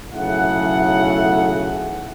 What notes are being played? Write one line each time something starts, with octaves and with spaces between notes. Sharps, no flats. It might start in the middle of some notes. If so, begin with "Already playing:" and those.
B1 C#3 A3 E4 F#5